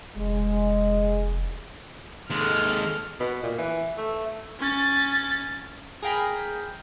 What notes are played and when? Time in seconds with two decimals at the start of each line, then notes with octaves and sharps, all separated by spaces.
0.16 F1 G#3
2.30 D#2 G#3 A4 F6
3.20 B2
3.43 A#2
3.58 E3
3.97 A3
4.59 C#4 A6
6.03 G#4 A#4 F5 G5 A#5 B5